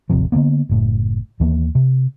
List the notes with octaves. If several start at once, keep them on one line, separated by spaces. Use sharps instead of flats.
D#1 G#1 C3 F3
D3 F3 A#3 B3
F#1 A2
D#2 E3 A#3
C3